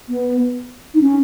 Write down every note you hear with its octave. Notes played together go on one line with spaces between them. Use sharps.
B3
D#4
C#4